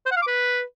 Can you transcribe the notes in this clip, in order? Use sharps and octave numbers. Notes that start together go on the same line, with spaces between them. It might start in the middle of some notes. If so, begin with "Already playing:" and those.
C5
F#5
F5
D6
B4